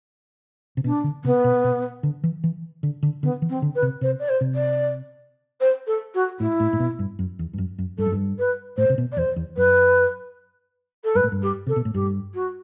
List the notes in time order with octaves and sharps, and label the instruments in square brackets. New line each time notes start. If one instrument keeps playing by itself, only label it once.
[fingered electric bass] C3
[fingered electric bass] B2 [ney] D4
[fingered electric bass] D3
[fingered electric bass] C3 [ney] B3
[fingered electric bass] B2
B2
D3
E3
E3
D3
D3
[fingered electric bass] D3 [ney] B3
[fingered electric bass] E3
[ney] C4
[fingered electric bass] D3
[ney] B4
[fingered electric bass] C3
[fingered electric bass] C3 [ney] C5
[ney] D5
C5
[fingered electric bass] C3
[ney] D5
C5
A4
F#4
[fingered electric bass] A2 [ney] E4
[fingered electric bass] A2
A2
B2
G2
F#2
E2
G2
F#2
F#2
[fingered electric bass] G2 [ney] A4
[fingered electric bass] F#2
G2
[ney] B4
[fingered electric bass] A2 [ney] C5
[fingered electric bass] C3
B2
[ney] D5
[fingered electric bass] E2 [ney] C5
[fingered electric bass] E2
[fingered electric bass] F#2 [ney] B4
[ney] A4
[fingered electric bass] G2 [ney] B4
[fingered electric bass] A2
G2
[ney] G4
[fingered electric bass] C3 [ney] A4
[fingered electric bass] B2
A2
[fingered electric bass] G2 [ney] G4
[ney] F#4